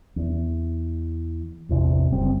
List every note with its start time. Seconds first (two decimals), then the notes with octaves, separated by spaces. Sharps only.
0.16 E2
1.69 A1 E2 C3
2.12 F#1 G3 C4